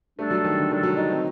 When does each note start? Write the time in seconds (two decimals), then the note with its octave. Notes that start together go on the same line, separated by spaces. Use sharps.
0.18 G3 A3 D4 A4
0.31 F#3
0.44 D#3
0.58 D3
0.71 D#3 G3 D4 A4
0.83 F#3
0.97 D#4
1.11 C4